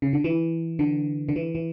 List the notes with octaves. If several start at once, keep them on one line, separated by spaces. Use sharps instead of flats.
C#3
D3
E3
D3
D3
E3
E3